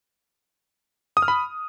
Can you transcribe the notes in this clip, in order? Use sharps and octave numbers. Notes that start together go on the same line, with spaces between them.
D#6
F6
B5